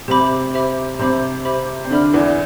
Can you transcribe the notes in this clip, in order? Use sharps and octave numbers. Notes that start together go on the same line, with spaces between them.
C3 C4 G4 C5 E5 B5 D6
G4 C5 E5 B5 D6
C3 C4 G4 C5 E5 B5 D6
G4 C5 E5 B5 D6
C4
D3 D4 A4 E5 B5 F6
E2 E3